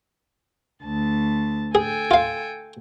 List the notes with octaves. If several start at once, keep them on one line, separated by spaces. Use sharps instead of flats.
D2 A5
G#4 A4 G5 G#5
F4 F5